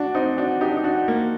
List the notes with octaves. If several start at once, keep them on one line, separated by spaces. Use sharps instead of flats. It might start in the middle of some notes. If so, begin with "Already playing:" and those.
Already playing: D4 F#4
C4 D#4
D4 F#4
D#4 G4
D4
D#4
D4 F#4
A#3